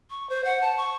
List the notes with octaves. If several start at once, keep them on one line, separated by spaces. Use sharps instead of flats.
C#6
C5
F#5
A5
C#6